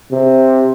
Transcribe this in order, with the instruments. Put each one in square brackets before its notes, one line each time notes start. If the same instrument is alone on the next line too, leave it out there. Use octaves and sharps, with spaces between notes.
[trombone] C3